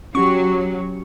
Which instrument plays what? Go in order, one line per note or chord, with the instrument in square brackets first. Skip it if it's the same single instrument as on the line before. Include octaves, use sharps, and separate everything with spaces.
[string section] F#3 [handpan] C#4 F#4 G4 [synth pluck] C#6